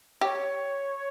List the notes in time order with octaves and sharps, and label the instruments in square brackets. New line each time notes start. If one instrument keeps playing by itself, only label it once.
[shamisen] G4 [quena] C#5